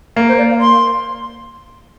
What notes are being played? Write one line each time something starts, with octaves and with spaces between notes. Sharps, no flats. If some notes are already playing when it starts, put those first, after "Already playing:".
A#3 A#4
C5
D5
F5
C6